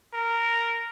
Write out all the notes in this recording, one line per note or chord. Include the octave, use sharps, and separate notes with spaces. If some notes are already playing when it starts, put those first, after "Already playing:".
A#4